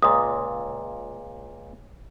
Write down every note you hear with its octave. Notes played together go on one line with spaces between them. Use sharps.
C#2 A#2 D#6